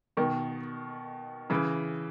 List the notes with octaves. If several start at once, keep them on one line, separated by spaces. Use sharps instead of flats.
B2 D#3
C#3 E3